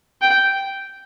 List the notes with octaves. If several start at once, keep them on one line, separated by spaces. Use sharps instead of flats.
G5